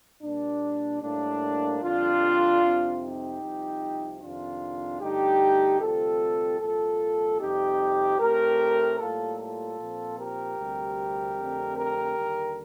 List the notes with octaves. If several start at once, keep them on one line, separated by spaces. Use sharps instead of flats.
A#2 G3 A#3 D4
A2 G3 A#3 D4
F2 D3 G3 D4 F4
F2 C3 G3 C4
D#4 G4
C2 C3 F3
F2 C3 D#3 D4 F4
G2 D3 A3 D#4 G4
D2 C3 G3 C4 F4 A4
C2 A#2 F3 F4 A4
F2 C3 G3 C4 D#4 G4
A2 A3 C4 G4 A#4
A2 G3 A#3 F4 A4
F4 A4
A#2 F3 C4
G4 A#4
D2 C3 G3 C4
F2 D3 A3 C4
G4 A#4
D#2 D3 G3